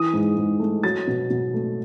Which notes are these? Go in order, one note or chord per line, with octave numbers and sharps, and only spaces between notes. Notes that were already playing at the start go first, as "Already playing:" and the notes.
Already playing: E3 D#6
G#2
G#2
A3
F#3 A6
B2
B2
A3